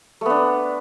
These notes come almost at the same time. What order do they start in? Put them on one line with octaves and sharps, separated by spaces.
A3 B3 D4